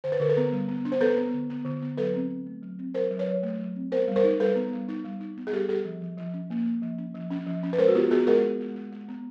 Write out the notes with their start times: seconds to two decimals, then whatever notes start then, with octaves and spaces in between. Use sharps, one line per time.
0.04 D3 C5
0.12 B4
0.20 D3 A#4
0.30 A4 B4
0.37 B3
0.52 G3
0.68 B3
0.85 D4
0.92 C5
1.01 B3 A4 B4
1.17 B3
1.34 D3
1.50 B3
1.65 D3
1.82 B3
1.98 F#3 A4 B4
2.14 C4
2.31 C4
2.46 A3
2.63 F#3
2.79 C4
2.94 F#3 A#4 C5
3.11 F#3
3.19 B4 C#5
3.27 F#3
3.43 A3
3.59 F#3
3.76 C4
3.92 B3 A#4 C5
4.08 G3
4.16 A#4 C5
4.24 D#4
4.40 G3 A4 B4
4.56 B3
4.73 G3
4.88 D#4
5.04 G3
5.21 D#4
5.37 B3
5.47 G#4
5.52 G3 G4 A4
5.69 G3 G4 A4
5.85 F3
6.02 F3
6.17 F3
6.34 C#4
6.50 A#3
6.66 A#3
6.82 F3
6.98 C#4
7.14 F3
7.31 C#4
7.46 F3
7.63 C#4
7.73 B4
7.78 G#3 A#4 C5
7.88 F#4
7.95 B3 F4 G4
8.11 B3 F#4 G#4
8.27 G#3 G#4 A#4
8.44 B3
8.60 G#3
8.76 G#3
8.92 G#3
9.08 B3